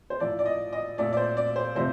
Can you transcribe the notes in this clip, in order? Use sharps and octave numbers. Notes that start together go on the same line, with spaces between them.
C5
A2 F3 A3 D5
D5
D#5
D#5
A#2 A3 D5
D5
C5
D5
C5
C3 F3 A3 C5